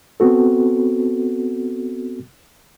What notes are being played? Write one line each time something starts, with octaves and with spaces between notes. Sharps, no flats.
B3 C4 F#4 A4